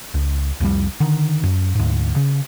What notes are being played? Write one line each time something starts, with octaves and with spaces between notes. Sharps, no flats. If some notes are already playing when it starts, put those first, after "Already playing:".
C#2
C2 F2 E3 G3
D3 D#3
F#2
D2 G#2
C#3